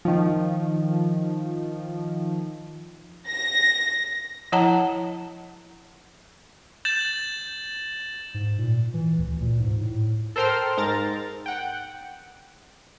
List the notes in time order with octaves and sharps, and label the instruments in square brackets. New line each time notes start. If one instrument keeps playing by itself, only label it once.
[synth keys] D#3 F3
[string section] A#6
[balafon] F3 E4 C#5 F#5 A5 A#5
[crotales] G6 A6 E7 F#7
[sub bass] G#2
A#2
E3
D2
A#2
G#2
A2
[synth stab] A4 A#4 C5 G5 C6 F6
G#2 A#4 A#5 A6
F#5 G5